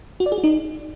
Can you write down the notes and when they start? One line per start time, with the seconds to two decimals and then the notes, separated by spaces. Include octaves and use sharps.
0.20 F#4
0.26 D5
0.32 G#4
0.38 F#4
0.44 D#4